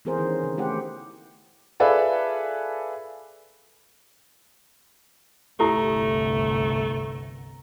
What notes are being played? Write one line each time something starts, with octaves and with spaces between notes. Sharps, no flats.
E3 B3 C4 G#4 A#4 C5
D#3 C#4
C#3
A3 E4 G4 C5 F#5
F4 G#4 A4 B4 D5 E5
G1 C2 A3 E4 G4 A4 A#5